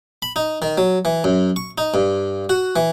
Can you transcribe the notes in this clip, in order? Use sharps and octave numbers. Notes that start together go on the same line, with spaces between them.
B5
D#4
D#3
F#3
E3
F#2
C#6
D#4
G2
F#4
E3